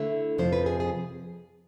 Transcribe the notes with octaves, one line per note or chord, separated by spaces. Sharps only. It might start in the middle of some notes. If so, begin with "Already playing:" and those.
Already playing: D3 A3 E4
F2 C3 F3 C5
B4
G#4
G#4